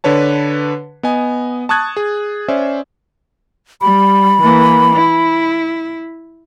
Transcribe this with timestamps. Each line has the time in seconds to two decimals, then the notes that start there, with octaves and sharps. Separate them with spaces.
0.04 D3 D4 B4 C#5 A5
1.03 B3 D#5 G#5
1.69 A5 C#6 D#6 F#6 G#6 A6
1.97 G#4
2.48 C#4 C5 D5 E5
3.81 G3 B5
4.42 E3 A#3
4.96 E4